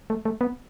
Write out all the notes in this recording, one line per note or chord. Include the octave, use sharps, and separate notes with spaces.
A3
A3
B3